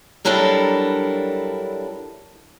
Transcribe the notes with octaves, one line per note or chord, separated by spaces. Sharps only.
F#3 G3 D4 E4 A4 A#4